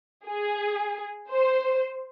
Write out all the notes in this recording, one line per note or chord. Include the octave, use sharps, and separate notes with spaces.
G#4
C5